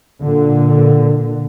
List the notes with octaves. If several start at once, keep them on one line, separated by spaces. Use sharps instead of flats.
A#2 D3